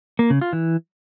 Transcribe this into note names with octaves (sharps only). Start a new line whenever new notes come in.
A#3
C#3
F4
E3